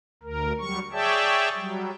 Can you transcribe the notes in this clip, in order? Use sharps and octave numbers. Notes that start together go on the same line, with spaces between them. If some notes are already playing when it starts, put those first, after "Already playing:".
D2 A#4
F#3 G3 C#6
G#4 C#5 D5 E5 G5 A5
F#3 G3